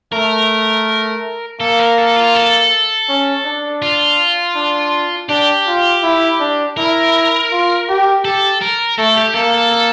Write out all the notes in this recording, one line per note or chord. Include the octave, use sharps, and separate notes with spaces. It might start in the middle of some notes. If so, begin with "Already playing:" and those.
A3 A#4
A#3 A4
A#4
A4
F4
A4
C#4
D4
F4
D4
D4 G4
F4
E4
D4
E4 A#4
F4
G4
G4 A4
A#4
A3 A4
G4
A#3 A4
A4
A4